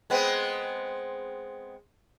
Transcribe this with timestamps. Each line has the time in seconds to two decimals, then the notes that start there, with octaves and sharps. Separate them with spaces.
0.10 G#3 B3 C4